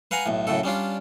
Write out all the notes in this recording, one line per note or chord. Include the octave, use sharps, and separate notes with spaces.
B4 F5 F#5 G#5 A#5
B1 A2
F#2 A2 C#3 A4
G3 C#4 D4 F4